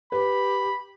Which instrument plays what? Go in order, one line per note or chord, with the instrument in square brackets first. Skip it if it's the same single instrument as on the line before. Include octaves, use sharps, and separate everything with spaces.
[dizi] G4 [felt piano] B4 [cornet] B5